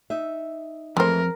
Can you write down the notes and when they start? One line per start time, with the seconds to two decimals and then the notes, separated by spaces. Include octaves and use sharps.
0.10 D#4 E5
0.97 F2 E3 G#3 A3 A#4 C5